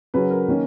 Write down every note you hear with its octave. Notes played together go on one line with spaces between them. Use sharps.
C#3 F#3 C#4 B4
A#4
D#3 A#3 C#4